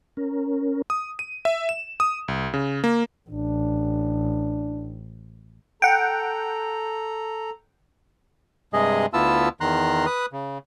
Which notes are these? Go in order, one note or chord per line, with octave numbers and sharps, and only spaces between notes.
C#4 A#4
D#6
D#7
E5
E7
D#6
C2
C#3
A#3
A1 D4
A4 F#5 G5 A#5
G2 C3 G#3 G#4 D#5
D2 B3 E4 F4 A5 E6
E2 D#3 A#5 C6 F#6
B4 D#6 F#6
C#3